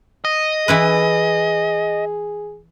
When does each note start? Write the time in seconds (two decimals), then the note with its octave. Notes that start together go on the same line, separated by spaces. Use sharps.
0.25 D#5
0.68 E3 E4 G#4 B4